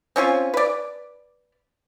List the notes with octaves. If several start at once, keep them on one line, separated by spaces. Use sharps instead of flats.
C4 C#4 F4 G#5
B4 D5